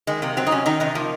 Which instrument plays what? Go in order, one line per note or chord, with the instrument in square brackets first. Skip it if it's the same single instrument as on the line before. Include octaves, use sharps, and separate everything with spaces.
[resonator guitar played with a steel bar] D#3 G#3
C3 A#3
F#3 C4
D#4
C3 C#4
D#3 D#4
C3 D#4
F3 A#3